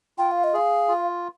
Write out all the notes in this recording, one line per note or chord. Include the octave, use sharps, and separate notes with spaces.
F4 G5
F5
D#5
G#4 F5
F4